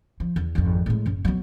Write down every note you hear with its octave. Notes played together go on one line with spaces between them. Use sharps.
F3
E2
G#1 F2
A2 G#3
F#1 C#4
F#3 B3